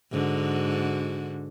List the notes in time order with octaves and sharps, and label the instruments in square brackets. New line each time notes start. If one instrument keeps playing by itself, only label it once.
[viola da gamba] G#2 D3 F#4